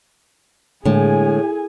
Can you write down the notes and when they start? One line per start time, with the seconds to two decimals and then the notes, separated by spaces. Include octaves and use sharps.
0.85 A2 D3 G#3 A#3 G#4 G#5